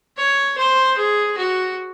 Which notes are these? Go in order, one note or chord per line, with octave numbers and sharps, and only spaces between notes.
C#5
C5
G#4
F#4